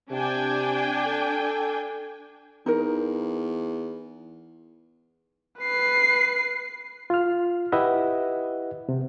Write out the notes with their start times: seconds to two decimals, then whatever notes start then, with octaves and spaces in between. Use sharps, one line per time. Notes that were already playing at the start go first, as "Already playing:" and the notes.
0.11 C3 D4 G5 G#5
1.06 A4
2.66 E2 D#4 A#4
5.60 B4 C7
7.10 F4 F6
7.72 E4 G4 B4 D#5 E5 F#5
8.89 C3